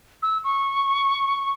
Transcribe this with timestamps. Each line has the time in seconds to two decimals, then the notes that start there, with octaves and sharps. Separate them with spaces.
0.22 E6
0.44 C#6